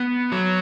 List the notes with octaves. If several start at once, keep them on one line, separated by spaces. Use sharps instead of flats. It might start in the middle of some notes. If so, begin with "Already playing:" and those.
Already playing: B3
F#3